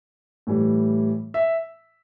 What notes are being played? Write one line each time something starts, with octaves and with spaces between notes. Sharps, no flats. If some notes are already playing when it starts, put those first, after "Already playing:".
A2 E3 G3
E5